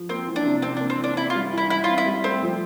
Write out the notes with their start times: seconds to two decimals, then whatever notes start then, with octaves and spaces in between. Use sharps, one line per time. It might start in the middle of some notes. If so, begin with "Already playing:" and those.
Already playing: F3
0.09 A#3 C4
0.27 E3
0.36 D4
0.45 C3
0.62 C3 C4
0.77 A#3 D4
0.90 C4
0.99 E3 D4
1.17 C4 E4
1.30 F4
1.35 G3
1.52 E3
1.58 E4
1.70 E3 E4
1.84 F4
1.89 C4
1.98 E4
2.06 G3
2.24 A3 C4
2.42 F3